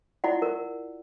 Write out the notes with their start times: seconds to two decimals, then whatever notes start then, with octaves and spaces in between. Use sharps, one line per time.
0.24 E4 F4 D5 F#5
0.42 A#4